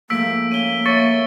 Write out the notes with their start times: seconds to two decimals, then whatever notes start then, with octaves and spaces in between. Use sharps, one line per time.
0.10 G#2 F3 A3 A#3 E6 B6 D7
0.51 A#3 C#4 D#7 G7
0.86 C#5 E5 C#6 A6 C#7